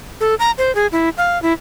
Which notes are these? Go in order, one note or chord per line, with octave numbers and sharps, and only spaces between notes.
A4
A#5
C5
G#4
E4
F5
E4